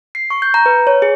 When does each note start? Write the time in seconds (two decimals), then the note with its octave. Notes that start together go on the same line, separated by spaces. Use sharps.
0.15 C7
0.30 C#6
0.42 G6
0.54 A#5
0.66 B4
0.87 C#5
1.02 G#4